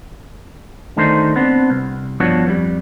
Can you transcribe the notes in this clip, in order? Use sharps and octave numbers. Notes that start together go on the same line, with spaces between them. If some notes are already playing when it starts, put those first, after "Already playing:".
D2 D#3 A3 D4 D#4 C5
B3 C4 D4
C2
G2 F3 B3 D4 F#4 C#5
F2 G3